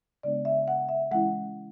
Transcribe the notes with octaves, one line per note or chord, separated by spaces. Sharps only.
C#3 G#3 B3 D4 D5
E5
F#5
E5
E3 G#3 C#4 E4 F#5